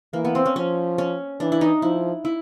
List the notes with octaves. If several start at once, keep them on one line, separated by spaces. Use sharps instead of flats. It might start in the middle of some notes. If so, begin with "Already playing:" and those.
E3 A#3
B3
C4
C#4
F3 C#4
C#4
E3 D4
E4
D#4
F3 E4
E4